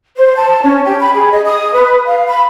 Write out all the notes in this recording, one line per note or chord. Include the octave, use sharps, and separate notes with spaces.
C5
A5
C#4
G4
B5
G#4
D#5
D#6
B4
F5
B5